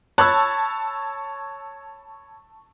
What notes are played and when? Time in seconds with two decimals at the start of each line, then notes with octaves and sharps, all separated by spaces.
0.18 C#5 A5 B5 C#6 E6 F#6